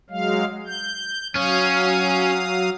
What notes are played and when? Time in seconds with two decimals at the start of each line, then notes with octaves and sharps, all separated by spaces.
0.10 F#3 G#3 F5
0.67 G6
1.35 F#3 C#4 F5 D#6